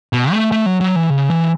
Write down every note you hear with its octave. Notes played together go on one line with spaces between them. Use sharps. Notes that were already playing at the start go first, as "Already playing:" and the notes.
B2
A3
A3
F#3
F#3
E3
C#3
E3